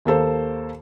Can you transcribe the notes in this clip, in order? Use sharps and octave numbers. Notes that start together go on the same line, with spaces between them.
D#2 A#3 A4 C5